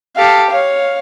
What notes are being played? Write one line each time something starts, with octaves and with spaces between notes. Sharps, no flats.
G4 A4 F5
C#5 F5